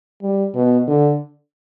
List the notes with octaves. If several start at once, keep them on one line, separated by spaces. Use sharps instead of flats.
G3
B2
D3